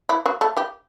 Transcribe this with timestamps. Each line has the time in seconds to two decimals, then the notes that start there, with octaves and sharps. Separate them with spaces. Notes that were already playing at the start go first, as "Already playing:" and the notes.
0.09 E3 E4
0.26 F#3 F#4
0.41 A3 A4
0.57 G3 G4